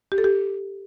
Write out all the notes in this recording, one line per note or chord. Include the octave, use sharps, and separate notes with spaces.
G4
A4
G4